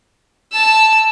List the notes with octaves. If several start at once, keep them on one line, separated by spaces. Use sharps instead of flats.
A5 E6